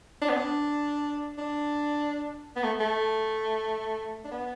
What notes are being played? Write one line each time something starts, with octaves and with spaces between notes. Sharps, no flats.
D4
B3
D4
D4
B3
A3
A3
D4
B3